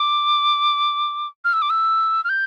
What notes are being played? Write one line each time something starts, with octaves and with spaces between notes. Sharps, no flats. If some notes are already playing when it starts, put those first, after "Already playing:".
Already playing: D6
F6
E6
D6
E6
F6
G6